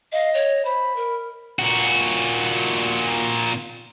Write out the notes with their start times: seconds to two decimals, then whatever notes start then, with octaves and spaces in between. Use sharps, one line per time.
0.13 D#5 F5
0.34 C#5
0.65 C5 B5
0.96 A#4
1.59 A#2 F#4